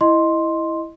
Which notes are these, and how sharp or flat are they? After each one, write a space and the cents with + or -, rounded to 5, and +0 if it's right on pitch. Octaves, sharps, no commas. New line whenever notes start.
E4 +0 D#5 +0 C6 +5